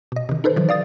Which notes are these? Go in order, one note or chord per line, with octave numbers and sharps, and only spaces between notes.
B2 D#5
C3 D#3
D#4 A4 B4 C5
D#3 E3 F#3
D5 F5 D#6 A6